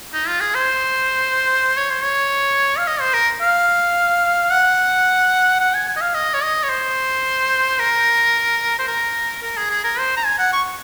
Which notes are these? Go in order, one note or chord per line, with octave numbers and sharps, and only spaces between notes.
D#4
F4
G#4
C5
C#5
C5
C#5
F5
D#5
C5
A#4
F5
F#5
F#5
G#5
G#5
D#5
F5
D#5
C#5
D#5
C#5
C5
A#4
C5
A#4
A#4
G#4
G#4
A#4
C5
A#5
G#5
F#5
C#6